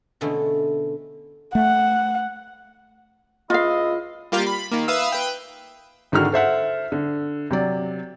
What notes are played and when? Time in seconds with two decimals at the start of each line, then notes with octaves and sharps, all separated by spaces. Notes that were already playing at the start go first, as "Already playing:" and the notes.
0.21 B2 D3 E3 G#3 A3 C#4
1.55 A3 F#5
3.50 C#2 E4 F4 D#5 F5
4.32 G3 A#3 F4 G4 F5
4.46 B5
4.72 D#3 A#3
4.88 B4 E5 F5 D#6 E6
5.12 B4 G5
6.12 G#1 D3 D#3 G#3 F#4 F6
6.32 A4 C5 E5 F#5
6.92 D3
7.50 C3 F#3 D5